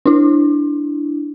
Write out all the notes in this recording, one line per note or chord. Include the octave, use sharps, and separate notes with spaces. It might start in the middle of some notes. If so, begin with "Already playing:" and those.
D4 E4